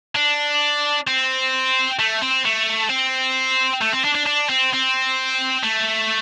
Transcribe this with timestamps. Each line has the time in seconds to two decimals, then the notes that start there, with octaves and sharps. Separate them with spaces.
0.16 D4
1.07 C4
1.99 A3
2.21 C4
2.45 A3
2.89 C4
3.81 A3
3.93 C4
4.04 D4
4.15 D4
4.26 D4
4.49 C4
4.73 C4
5.64 A3